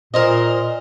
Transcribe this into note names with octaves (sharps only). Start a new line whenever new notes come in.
A#2 A#4 C5 D#5